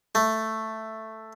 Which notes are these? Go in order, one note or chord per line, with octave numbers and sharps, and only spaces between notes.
A3